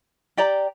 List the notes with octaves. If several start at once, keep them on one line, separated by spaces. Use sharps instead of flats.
G4 D5 G5 A#5